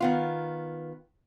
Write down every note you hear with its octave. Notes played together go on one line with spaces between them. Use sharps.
D#3 B3 F4